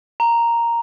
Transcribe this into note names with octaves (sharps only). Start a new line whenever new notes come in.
A#5